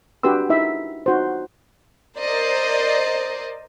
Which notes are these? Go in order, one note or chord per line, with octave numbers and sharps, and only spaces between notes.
D4 F#4 G4 B4 C6 E6
D#4 E4 E5
D#4 F#4 C5
A#4 C5 D5 D#5